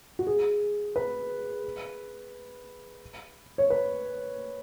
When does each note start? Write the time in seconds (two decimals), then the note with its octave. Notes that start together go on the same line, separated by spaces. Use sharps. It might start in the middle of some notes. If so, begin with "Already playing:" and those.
0.19 F#4
0.27 G#4
0.96 B4
3.58 C#5
3.70 B4